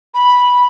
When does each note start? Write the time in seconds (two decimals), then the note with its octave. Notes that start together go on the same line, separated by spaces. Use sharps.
0.14 B5